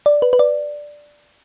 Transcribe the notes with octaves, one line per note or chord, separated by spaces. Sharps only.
D5
B4
B4
D5